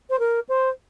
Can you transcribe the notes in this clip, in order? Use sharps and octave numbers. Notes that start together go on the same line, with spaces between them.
C5
A#4
C5